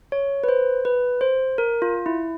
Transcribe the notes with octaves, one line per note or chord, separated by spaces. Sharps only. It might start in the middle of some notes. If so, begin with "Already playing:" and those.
C#5
B4
C5
B4
C5
A#4
F4
E4